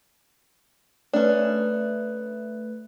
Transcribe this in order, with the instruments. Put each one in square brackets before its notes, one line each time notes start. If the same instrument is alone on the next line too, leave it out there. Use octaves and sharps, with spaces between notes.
[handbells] A3 B4 [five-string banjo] C#4 D4